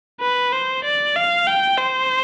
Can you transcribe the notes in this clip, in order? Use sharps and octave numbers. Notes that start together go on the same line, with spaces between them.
B4
C5
D5
F5
G5
C5